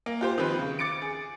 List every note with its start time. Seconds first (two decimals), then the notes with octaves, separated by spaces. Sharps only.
0.06 A#3
0.21 F4 G4 C5
0.38 D#3 F3 C4 B4
0.59 C#3
0.79 D6 A6 C#7 D7
1.02 G#4